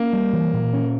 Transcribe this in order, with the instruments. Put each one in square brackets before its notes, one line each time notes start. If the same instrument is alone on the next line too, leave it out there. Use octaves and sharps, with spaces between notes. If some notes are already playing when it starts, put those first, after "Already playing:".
Already playing: [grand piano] A#3 [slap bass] C#4
[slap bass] G3
E3
A#2
C#4